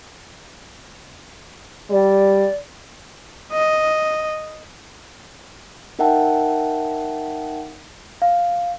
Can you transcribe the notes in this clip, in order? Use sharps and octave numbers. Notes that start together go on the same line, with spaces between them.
G3 D5
D#5
D#4 A#4 E5 F#5 G5 A5
F5